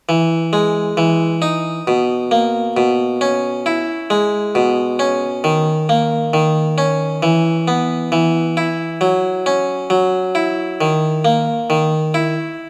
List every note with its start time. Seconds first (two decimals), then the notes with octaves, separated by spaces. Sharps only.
0.09 E3
0.53 G#3
0.97 E3
1.42 D#4
1.87 B2
2.31 A#3
2.77 B2
3.21 C#4
3.66 E4
4.10 G#3
4.55 B2
4.99 C#4
5.44 D#3
5.89 A#3
6.33 D#3
6.78 C#4
7.23 E3
7.68 B3
8.12 E3
8.57 E4
9.01 F#3
9.46 C#4
9.90 F#3
10.35 E4
10.81 D#3
11.25 A#3
11.70 D#3
12.14 E4